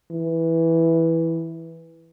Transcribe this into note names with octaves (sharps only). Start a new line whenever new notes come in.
E3